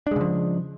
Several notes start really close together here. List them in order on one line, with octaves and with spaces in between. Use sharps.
D4 G#3 C#3 F3